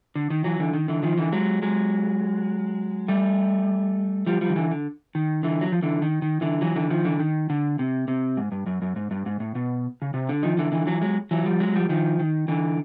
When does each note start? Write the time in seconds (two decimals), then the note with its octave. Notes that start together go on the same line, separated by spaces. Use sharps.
0.15 D3
0.30 D#3
0.44 E3 F#3
0.60 D3 E3
0.73 D#3
0.88 D3 E3
1.03 D#3 F3
1.17 D3 E3
1.32 F#3 G#3
1.62 F#3 G#3
3.08 G3 A3
4.26 F3 G3
4.41 F3 G3
4.50 D#3
4.56 D3 E3
4.71 D3
5.15 D#3
5.43 D3 E3
5.61 F#3
5.72 F3
5.82 D3 E3
6.02 D#3
6.22 D#3
6.41 D3 E3
6.61 E3 F#3
6.76 D3 E3
6.90 D#3 F3
7.05 D3 E3
7.20 D#3
7.50 D3
7.79 C3
8.08 C3
8.37 G#2
8.52 G2
8.66 F#2
8.82 F#2
8.96 G#2
9.11 G2
9.26 G#2
9.40 A2
9.55 B2
10.02 C#3
10.14 C3
10.29 D3
10.43 D#3 F3
10.57 D3 E3
10.72 D3 E3
10.87 E3 F#3
11.01 F#3 G#3
11.31 E3 F#3
11.45 F3 G3
11.60 F#3 G#3
11.75 F3 G3
11.89 D#3 F3
12.19 D#3
12.48 D3 E3